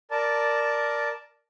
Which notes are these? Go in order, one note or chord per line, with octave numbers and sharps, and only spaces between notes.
A#4 D5 A5